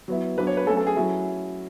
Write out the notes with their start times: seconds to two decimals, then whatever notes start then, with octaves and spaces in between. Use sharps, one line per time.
0.08 F#3 B3 E4
0.37 F#3 B3 D4 B4
0.47 C#5
0.57 B4
0.67 F#3 A3 C#4 A4
0.77 A4
0.87 G#4
0.96 F#3 C#4 E4